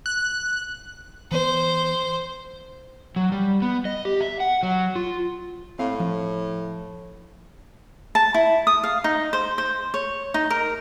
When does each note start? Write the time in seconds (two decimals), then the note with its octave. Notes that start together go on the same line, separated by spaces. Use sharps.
0.06 F#6
1.31 E3 B3 C5
3.16 F#3
3.32 G3
3.62 B3
3.85 D#5
4.05 G4
4.21 E5
4.40 F#5
4.63 F#3
4.96 F4
5.79 A2 C4 F5
6.00 F3
8.15 A5
8.34 E4
8.67 D#6
8.84 F5
9.04 D#4
9.33 C5
9.58 C5
9.94 C#5
10.34 D#4
10.50 A#4